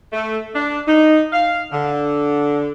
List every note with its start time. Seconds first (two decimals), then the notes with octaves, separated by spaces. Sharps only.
0.12 A3
0.54 D4
0.88 D#4
1.33 F5
1.72 D3